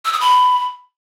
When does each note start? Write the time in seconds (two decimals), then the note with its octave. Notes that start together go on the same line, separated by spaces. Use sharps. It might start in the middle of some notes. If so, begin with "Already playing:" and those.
0.05 E6
0.13 D#6
0.20 B5